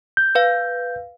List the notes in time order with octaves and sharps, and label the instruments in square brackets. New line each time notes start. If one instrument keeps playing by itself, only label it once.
[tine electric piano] G6
[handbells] B4 F5